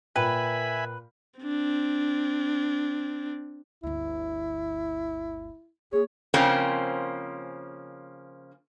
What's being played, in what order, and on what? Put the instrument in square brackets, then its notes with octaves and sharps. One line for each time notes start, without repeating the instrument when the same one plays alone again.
[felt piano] A#2 A#4 G5 [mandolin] B4 [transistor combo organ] E5 G#5 B5
[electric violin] C4 D4
[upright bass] G1 D2 [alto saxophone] E4
[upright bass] A#3 [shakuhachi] G#4 [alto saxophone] C#5
[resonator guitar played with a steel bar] C#3 F3 A#3 C4 C#4